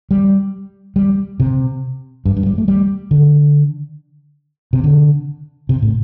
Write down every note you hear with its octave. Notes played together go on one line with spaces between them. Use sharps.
G3
G3
C3
G2
G2
G3
A3
G3
D3
C3
D3
C3
A2